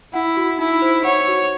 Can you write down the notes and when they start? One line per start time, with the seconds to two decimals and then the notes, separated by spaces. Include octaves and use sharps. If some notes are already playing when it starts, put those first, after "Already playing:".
0.14 E4 F#5
0.37 F#4
0.59 D#4 E4
0.82 C5
1.05 C#5 F#5
1.28 F#4